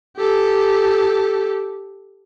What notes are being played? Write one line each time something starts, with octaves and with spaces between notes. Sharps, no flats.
G4 A4